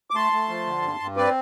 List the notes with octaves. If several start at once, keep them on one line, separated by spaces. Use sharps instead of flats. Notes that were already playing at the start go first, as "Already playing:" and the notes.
D6
A3 A5 C6
A3
F3
D3
G2
G2
C4 B4 D5